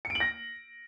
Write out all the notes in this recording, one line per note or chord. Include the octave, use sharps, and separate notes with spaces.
C#7
D7
F#7
A#6